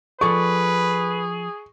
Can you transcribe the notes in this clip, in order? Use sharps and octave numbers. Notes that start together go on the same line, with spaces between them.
F3 G#4 A4 B4 D5 C#6